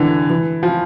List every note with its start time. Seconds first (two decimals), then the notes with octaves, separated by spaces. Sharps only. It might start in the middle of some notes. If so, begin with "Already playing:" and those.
Already playing: D3 E3
0.30 E3
0.63 F3